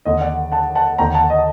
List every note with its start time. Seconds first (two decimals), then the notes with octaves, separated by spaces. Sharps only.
0.05 D#2 D3 D#5
0.21 D5 F#5
0.52 F#5 A5
0.75 F#5 A5
0.98 D#2 D3 G5 A#5
1.14 F#5 A5
1.30 D#5